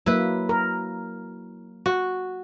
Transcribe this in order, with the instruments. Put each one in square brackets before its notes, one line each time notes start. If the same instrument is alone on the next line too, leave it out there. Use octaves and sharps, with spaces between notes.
[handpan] F#3 A#3 [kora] E4 B4
[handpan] A#4
[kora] F#4